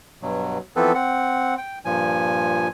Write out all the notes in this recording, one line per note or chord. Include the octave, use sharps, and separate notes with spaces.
G2 B2 F#3
E3 F3 B3 C4 A4 B4
C4 F#5
G5
G2 A#2 F3 G#5